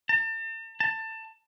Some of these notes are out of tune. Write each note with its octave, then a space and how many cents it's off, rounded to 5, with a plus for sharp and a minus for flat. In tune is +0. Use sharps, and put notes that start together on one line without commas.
A5 +40
A5 +20